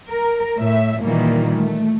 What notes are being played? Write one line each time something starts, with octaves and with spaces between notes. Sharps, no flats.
A#4
A2 E5
A#2 D#3 E3 G3 A#3
A3